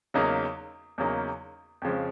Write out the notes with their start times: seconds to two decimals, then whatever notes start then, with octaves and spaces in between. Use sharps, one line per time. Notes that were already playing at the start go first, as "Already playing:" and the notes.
0.14 E2 C#3 F#3 A#3 D#4
0.98 E2 C#3 F#3 A#3 D#4
1.82 F2 C#3 F3 G#3